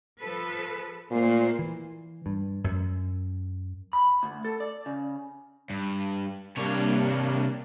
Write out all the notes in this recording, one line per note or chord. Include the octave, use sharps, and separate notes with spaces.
F3 A4 B4
A#2 A3 A#3 C5
E3
G2
F#2
B5
D2
A4
D5
C#3
G2
C3 G3 A#3 D4 C#5